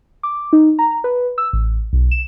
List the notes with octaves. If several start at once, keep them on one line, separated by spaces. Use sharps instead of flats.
D6
D#4
A#5
B4
E6
A1
B1
E7